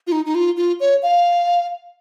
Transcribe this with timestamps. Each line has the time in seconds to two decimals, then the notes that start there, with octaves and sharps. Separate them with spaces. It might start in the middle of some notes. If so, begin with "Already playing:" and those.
0.07 F4
0.12 D#4
0.25 D#4
0.35 F4
0.57 F4
0.80 C#5
1.03 F5